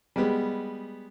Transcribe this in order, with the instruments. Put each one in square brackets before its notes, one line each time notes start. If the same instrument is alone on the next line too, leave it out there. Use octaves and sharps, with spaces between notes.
[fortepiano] G3 G#3 B3